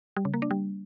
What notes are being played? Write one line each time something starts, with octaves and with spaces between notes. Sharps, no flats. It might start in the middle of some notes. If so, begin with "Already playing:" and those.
G3
C#3
A#3
D4
G3